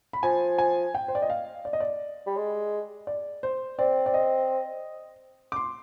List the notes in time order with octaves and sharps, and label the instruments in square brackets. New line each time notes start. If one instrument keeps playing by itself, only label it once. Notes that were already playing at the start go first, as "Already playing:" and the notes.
[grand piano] B5
[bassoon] F3 [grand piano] G#5
[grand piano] G#5
G5
C5
D5
D#5
F5
D5
D#5
D5
[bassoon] G3
G#3
[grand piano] D5
C5
[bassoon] C4 [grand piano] D5
[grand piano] D5
D#5
D6
C6